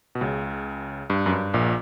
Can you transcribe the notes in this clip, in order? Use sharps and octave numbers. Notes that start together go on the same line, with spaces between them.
B2
C#2 C#3
G2
F#2
G2
A#1 A#2